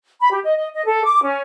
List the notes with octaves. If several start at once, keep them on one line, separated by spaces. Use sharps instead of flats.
B5
G4
D#5
D#5
D#5
A4
D6
C#4